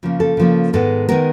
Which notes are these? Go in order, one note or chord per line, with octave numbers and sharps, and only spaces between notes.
C#3 F3 A#3
A4
C#3 F3 A#3
G#2 D#3 G#3 B3 A4
D#3 G#3 B3 A#4